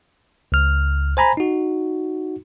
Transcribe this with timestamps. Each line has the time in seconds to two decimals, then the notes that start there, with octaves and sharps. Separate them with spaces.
0.52 C#2 F6
1.17 C5 G#5 A#5 B5
1.37 D#4 F#4